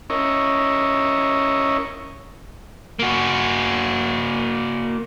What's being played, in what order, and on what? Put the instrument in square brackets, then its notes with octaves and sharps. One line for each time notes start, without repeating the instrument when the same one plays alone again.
[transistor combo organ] C#4 E4 A#4 C#5 D#5
[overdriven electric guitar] A#3 F#4